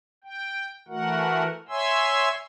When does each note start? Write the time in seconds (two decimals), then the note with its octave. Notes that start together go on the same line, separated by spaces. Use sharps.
0.24 G5
0.88 E3 A3 F#4 A#4 F#5
1.69 C#5 E5 G#5 C6 E6